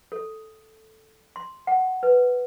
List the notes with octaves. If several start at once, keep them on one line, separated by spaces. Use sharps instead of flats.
A4
C6
F#5
B4